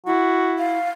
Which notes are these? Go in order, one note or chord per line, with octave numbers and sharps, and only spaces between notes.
E4 F#4
F5